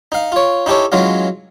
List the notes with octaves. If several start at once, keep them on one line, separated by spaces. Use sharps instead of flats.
D#4 F5
F4 C#5
D#4 E4 G4 A4 C#5
E3 F#3 G#3 C#4 F4